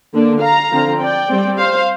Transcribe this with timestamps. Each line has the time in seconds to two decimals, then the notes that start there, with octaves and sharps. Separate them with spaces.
0.14 D3 A#3 D4
0.41 F5 A#5
0.71 D3 F3 C4
1.00 D5 G5
1.28 G3 C4
1.58 C5 F5